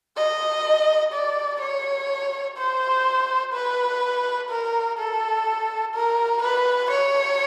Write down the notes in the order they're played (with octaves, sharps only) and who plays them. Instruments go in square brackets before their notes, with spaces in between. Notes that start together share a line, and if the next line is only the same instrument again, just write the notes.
[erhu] D#5
D5
C#5
C5
B4
A#4
A4
A#4
B4
C#5